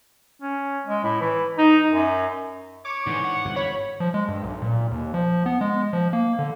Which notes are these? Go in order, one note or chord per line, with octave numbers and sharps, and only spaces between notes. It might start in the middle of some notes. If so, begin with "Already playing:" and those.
C#4
G#3
A2
E3
D#4
F#2
C#5 D6
G#2 D3 E3 G#3
F#5
G1 F2 G#2
C#5 B5
F3
G#3
G2
B1
A#2
D#2
F3
B3
G#3
F3
A#3
D3